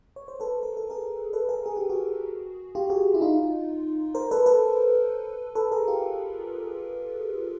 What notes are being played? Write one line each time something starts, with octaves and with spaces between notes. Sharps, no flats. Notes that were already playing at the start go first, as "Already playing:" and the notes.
C#5
C5
A4 B4
A#4
A4
G#4 A#4
A4 B4
G#4 A#4
G#4
G4
F#4 G#4
F4 G4
F#4 G#4
E4
D#4 F4
A#4 C5
A4 B4
A4 B4
A4 B4
G#4 A#4
F4 G4